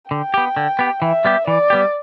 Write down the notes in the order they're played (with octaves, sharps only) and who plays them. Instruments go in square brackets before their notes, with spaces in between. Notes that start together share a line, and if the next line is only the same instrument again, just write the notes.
[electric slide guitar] D3 [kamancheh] G5
[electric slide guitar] B3 G4
D3
B3 G4
[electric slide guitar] E3 [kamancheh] E5
[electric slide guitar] G3 B3 G4
[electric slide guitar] E3 [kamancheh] D5
[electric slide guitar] G3 B3 G4